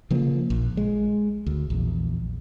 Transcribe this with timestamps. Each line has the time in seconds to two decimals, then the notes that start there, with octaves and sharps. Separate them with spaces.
0.11 C#3 F3 A#3
0.50 A#1
0.77 G#3
1.47 D2
1.70 A#1 E2